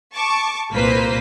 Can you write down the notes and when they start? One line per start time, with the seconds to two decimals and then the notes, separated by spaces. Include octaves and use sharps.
0.15 A5 C#6 D6
0.73 C2 A#2 A#3 B4 C5 B6